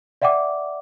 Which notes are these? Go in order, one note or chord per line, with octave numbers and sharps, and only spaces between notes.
D5 E5 F#5 G5 D6